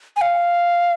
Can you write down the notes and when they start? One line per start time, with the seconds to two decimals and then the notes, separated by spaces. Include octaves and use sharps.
0.16 G#5
0.22 F5